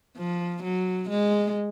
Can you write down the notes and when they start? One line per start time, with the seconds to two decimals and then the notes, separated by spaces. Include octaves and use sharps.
0.17 F3
0.63 F#3
1.10 G#3